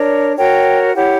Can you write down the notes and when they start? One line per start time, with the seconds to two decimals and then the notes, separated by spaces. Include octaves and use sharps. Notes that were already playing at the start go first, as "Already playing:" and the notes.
Already playing: D4 A#4 C#5
0.37 F#4 A#4 C#5 G5
0.95 E4 G4 C#5 F#5